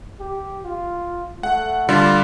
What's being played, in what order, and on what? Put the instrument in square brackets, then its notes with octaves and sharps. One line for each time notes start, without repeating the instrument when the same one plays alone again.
[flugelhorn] G4
F4
[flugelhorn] A3 [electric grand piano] F#5
[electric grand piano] D3 G3 [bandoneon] F4